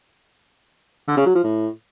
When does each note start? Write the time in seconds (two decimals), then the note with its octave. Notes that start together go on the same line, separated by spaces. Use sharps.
1.08 D3
1.17 C#3
1.26 F#3
1.35 F3
1.44 A2